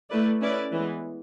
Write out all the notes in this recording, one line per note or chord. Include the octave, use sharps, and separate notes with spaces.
A3 E4 B4 D5
C#4 E4 B4 D5
E3 G#3 B3